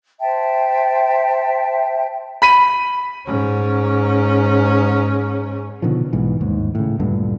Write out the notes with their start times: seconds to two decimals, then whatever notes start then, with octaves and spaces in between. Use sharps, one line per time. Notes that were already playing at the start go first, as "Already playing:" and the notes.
0.21 C5 E5 G5 A5
2.42 B5 B6 D#7
3.26 G#2 C#4
5.82 B2 D3 D#3 F3
6.13 B1 G#2 E3
6.40 G1 D#2 G#2
6.75 A2 C#3
7.00 D2 G2 A#2 D3